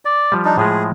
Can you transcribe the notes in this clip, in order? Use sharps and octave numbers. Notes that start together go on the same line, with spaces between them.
D5
F3 G3
D4 D#4
A2 F3 G#3 G#4